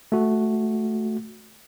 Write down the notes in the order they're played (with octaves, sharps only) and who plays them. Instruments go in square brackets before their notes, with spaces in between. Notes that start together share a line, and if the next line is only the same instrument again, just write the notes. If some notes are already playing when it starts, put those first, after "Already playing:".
[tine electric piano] A3 F#4